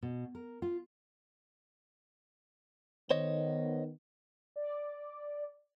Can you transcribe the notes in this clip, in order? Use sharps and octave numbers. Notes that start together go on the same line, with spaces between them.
B2
A#4
F4
D#3 B3 C5 C#5 D#5
D5